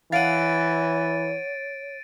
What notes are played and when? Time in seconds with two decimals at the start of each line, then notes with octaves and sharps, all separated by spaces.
0.12 E3 C#5 F5 F#5 A6 D7 D#7